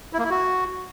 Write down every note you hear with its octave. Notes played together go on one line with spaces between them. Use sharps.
E4
A#3
E4
F#4